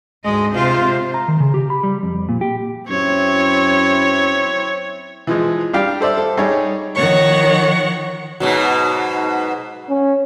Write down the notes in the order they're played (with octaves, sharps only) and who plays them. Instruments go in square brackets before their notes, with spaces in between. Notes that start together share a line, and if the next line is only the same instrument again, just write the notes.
[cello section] D2 G#2 D#5 [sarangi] G#3
[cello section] C3 C5 [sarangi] F4
[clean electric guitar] A#5
D#3
C#3
G4
B5
G3
F2
A#2
G4
[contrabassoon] F#2 [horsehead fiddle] C4 E4 [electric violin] C#5
[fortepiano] E3 F3 G#3
G3 D4 G4 F5 G5
A4 C5 D5 E5
A4
G3 D#4 G#4 C#5 D#5
[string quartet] D#3 F3 C#5 F#5 C#6
[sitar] G#2 B2 F#3
[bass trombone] C#4